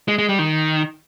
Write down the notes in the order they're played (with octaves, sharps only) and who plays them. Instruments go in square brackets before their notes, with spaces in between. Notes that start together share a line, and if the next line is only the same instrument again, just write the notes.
[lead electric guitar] G#3
G#3
G3
D#3